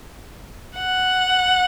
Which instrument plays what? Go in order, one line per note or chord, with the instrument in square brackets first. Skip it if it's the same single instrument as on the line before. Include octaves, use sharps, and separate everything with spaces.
[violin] F#5